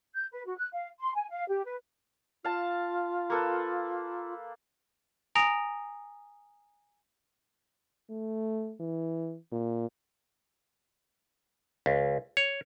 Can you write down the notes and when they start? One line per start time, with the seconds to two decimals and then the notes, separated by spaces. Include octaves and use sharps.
0.15 G6
0.32 B4
0.46 F#4
0.59 F#6
0.73 F5
1.00 C6
1.15 G#5
1.30 F5
1.48 G4
1.65 B4
2.44 F4 F5 A5
3.30 A#3 A4 B4
5.35 G#5 A#5 D#6 A#6 D7 F7
8.10 A3
8.80 E3
9.52 A#2
11.86 C#2
12.37 C#5